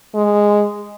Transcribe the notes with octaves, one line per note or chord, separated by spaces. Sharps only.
G#3